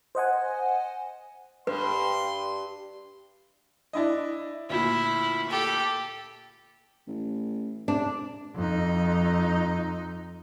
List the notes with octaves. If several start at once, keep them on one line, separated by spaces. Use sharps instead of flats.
C5 D#5 F#5 G#5
G2 B4 C6
D4 E4 D#5
D2 A#2 E4
G4 A4
A1
C3 D4
F2 D#4